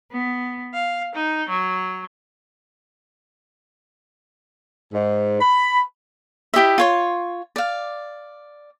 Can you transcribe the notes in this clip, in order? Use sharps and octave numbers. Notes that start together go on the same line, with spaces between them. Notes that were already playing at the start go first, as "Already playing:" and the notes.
B3
F5
D#4
F#3
G#2
B5
E4 G4 D#5 E5
F4 C#5 C6
D5 F5